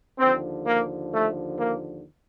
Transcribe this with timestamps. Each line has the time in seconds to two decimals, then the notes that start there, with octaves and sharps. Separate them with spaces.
0.19 D#2 D3 F3 C4
0.66 A#3
1.12 A3
1.58 A#3